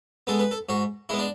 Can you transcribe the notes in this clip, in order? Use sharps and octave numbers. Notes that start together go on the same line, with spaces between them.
G#3 B3 A4
B4
A4
G#2 F#4
G#3 B3 E4
D4